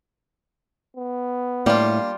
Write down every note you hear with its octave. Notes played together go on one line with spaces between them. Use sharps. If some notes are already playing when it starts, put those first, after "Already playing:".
B3
A2 G3 A#3 D4 F4